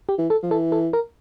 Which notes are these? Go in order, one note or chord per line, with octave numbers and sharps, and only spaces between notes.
G4
E3
A4
F3
E3 A4
A4
A#4